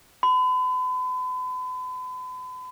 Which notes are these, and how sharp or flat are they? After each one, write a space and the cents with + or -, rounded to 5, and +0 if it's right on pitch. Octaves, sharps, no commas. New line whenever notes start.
B5 +40